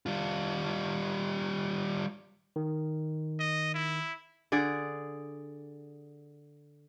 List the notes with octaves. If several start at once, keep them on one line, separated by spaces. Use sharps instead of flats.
G3 F4
D#3
D#5
E4
D3 G#4 D5